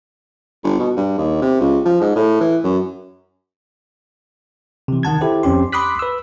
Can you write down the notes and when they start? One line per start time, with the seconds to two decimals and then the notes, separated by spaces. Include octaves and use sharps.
0.64 G1
0.79 B2
0.97 G2
1.18 D#2
1.42 C3
1.60 C#2
1.85 F3
2.01 G#2
2.16 A2
2.41 E3
2.64 F#2
4.88 C3 E3
5.03 D#3 F#5 A5 G#6
5.21 E4 G4 A4 C5
5.43 F2 C4 C#4 G4 C6
5.72 B5 C6 D6 D#6 F#6 B6
5.99 B4 E6